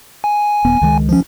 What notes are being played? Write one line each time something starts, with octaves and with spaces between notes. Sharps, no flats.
G#5
D#1 B3
C#2 D#3 G#3
F3 C#4